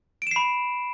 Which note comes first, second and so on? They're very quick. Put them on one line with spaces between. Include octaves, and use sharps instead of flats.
D7 E7 C7 B5